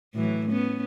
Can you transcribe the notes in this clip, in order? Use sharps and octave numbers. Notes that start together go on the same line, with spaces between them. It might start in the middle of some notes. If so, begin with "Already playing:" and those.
A2 E3 F#3
B3 C#4